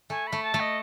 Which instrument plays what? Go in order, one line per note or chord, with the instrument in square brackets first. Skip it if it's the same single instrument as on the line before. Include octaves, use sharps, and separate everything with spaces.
[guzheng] A3 [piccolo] G#5
[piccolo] B5
[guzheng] A3
[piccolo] A5
[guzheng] A3
[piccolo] D#5